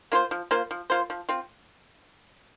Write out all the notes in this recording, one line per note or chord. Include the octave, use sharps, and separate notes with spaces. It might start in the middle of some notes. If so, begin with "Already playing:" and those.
A#3 F4 C5
F3
A#3 F4 C5
F3
A#3 F4 C5
F3
C4 F4